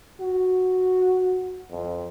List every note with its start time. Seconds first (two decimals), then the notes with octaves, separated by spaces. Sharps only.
0.20 F#4
1.71 F2